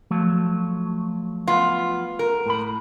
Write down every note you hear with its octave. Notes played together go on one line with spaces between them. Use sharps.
F3 F#3 A3
B3 F4
A#4
A2 B5